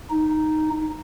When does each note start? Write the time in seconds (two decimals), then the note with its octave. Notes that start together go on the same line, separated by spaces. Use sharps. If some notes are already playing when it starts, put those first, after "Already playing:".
0.10 D#4